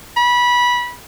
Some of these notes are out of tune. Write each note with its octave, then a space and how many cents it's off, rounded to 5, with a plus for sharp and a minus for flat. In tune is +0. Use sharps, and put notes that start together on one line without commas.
B5 -20